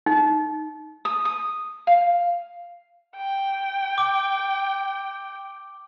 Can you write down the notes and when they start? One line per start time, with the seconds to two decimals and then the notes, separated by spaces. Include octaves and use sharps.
0.06 D#4
1.05 D#6
1.25 D#6
1.87 F5
3.17 G5
3.98 D6